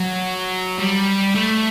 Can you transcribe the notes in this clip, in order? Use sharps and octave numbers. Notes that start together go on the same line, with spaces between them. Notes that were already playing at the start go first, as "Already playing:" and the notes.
Already playing: F#3
G3
A3